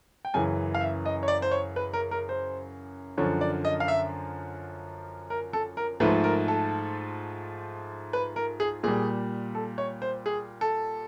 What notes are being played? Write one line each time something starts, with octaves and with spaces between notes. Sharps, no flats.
G5
F#2 C#3 E3 G#5
F5
E5
D#5
C#5
D5
C5
C#5
B4
A#4
A#4
C5
F#2 D3 F3 C#5
D5
D#5
F5
E5
A#4
A4
A#4
G#2 F3 A3 B4
A#4
A4
B4
A#4
G#4
A#2 G3 G#4
A4
C#5
C5
G#4
A4